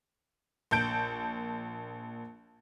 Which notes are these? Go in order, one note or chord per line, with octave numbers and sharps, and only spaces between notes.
A#1 A5 G6 D7